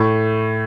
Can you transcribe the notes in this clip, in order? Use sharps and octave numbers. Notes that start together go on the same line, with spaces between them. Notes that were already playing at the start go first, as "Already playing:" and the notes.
Already playing: A2 A3